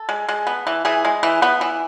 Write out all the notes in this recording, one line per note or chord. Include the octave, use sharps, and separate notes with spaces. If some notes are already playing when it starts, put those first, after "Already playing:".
Already playing: A4
G#3
G#3
B3
E3
E3 G#4
G#3
E3
B3
E3